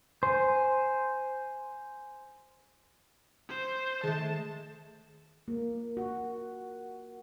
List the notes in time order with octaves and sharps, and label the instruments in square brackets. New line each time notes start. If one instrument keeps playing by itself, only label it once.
[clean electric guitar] C5 [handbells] G#5
[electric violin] C5
[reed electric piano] D#3 [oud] G#3 A3 [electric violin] A5
[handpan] A#3
F#4